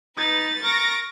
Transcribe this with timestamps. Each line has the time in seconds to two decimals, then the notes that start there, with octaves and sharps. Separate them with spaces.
0.18 D#4 B4 A6
0.63 A#4 C#6 A#6 D7